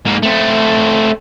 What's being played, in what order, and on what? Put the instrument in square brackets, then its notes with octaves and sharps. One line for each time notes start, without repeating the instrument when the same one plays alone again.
[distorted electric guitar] G#2 A#3
A3 C4